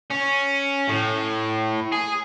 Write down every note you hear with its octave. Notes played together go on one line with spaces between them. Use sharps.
C#4
A2
G#4